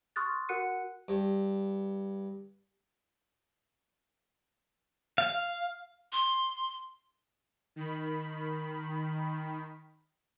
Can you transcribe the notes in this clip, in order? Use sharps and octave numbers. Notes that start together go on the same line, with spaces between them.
C6 C#6 D#6 F6 F#6 A6
F#4 A#4 F#5 F#6 C#7 D#7
G2
F5
C6
D#3 B5